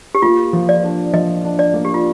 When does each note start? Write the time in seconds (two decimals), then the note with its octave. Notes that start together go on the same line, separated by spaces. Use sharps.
0.15 G4
0.22 A#3 F4
0.53 F3
0.69 D5
0.83 D4
1.13 F3 D#5
1.44 D4
1.59 D5
1.74 A#3
1.85 G4
1.94 F4